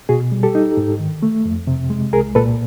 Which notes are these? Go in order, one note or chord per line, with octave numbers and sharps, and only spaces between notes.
B2 F#4 G#4
G3
G4 A4
D#4
G#2
D#3
A3
F2
C3
G#3
C2 G#4 A#4
A#2 A4 B4